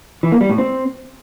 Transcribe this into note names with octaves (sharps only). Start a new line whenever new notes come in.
E3
A#3
G3
A2
C4